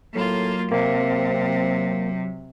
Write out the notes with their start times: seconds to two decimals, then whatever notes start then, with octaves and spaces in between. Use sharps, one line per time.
0.15 A2 F#3 A#3 F4
0.72 C3 A#3 C4